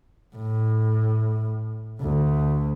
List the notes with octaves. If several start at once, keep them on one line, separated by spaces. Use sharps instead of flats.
A2
D2